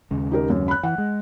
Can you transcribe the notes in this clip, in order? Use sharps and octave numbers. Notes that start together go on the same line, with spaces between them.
D#2 C#3 G#3
D#4 G4 A#4
F#2
B5 F#6
E3 F#5
G#3